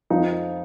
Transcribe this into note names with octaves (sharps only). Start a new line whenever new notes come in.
F2 F3 D#4